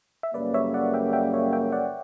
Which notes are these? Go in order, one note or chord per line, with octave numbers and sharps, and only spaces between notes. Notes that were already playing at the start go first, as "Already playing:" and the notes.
E5
F#2 C#3 G3 A#3 B4 D5
C#5 E5
D5 F#5
E5 G5
E5 G5
C#5 E5
E5 G5
D5 F#5